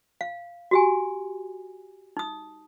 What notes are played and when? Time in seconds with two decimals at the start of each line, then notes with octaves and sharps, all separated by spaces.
0.21 F5
0.71 F#4 G4 G#5
2.17 D#4 D#6